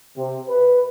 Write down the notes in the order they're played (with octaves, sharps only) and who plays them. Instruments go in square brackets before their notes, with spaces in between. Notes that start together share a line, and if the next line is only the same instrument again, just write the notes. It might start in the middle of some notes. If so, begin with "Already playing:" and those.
[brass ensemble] C3
B4